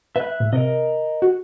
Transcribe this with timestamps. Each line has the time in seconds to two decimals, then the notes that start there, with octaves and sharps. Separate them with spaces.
0.16 B4 E5 F#6
0.40 A2
0.53 C3 A#4 D#5
1.22 F#4